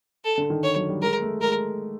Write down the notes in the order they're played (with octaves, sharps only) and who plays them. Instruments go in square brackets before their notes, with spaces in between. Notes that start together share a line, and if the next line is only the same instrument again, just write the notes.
[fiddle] A4
[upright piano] D3
D#3
[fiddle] C#5
[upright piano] F#3
G3
[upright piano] G#3 [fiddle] A#4
[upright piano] A3
[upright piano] G#3 [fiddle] A#4